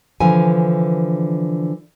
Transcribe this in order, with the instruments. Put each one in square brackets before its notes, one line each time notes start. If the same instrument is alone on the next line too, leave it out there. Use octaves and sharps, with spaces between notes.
[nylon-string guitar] D3 E3 F3 G#5